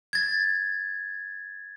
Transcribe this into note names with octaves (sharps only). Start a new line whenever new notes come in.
G#6 A6